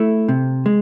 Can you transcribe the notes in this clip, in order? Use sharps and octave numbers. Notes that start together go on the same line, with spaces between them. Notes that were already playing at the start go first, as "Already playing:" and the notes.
Already playing: A3 E4
C3
G#3